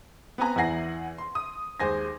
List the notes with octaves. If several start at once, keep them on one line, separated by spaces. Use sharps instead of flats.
B3 C4 B4 G#5 A#5
E2 E4 F#5 G#5 A#6 C7
C6
D#6
D#2 G#3 C5 G#5 C6 A#6